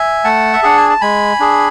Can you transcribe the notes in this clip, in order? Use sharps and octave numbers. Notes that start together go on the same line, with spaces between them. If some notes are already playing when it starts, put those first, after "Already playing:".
Already playing: E5 G#5
A3 F#5 A5
E5
D4 G#4 F#5
G#5
A5
G#3 G#5 B5
D4 G#4